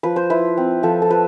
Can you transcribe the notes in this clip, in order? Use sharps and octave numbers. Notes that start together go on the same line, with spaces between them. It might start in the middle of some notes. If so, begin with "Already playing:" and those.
F3 B4
C5
E4 B4
C4
F3 A4
A4
F3 B4